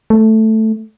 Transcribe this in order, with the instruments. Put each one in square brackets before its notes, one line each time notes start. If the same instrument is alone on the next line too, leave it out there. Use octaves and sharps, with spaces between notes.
[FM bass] A3